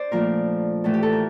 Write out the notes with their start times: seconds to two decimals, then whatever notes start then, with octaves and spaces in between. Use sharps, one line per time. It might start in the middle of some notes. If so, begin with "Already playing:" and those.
Already playing: D4 C5 D5
0.11 A#2 F3 A3 A#4
0.84 A2 E3 A3 A4
0.94 G4
1.03 A4
1.12 A#4